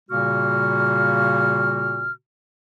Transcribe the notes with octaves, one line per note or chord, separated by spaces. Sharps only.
A#2 C#3 G3 A#3 F#4 F6